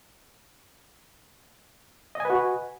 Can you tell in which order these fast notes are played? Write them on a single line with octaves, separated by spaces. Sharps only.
D#5 G#5 B4 F#4